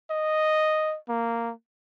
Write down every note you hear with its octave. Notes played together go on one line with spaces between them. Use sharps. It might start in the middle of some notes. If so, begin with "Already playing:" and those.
D#5
A#3